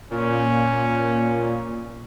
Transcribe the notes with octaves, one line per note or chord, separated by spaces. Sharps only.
A#2 C#4